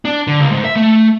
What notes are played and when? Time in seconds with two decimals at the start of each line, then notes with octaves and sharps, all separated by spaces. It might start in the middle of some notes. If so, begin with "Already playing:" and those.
0.05 D4
0.27 D3
0.40 C#2
0.51 G#2
0.65 E5
0.76 A3